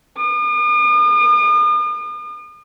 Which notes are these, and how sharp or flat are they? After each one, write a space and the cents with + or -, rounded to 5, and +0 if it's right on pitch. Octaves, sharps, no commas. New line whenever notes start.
D#6 -45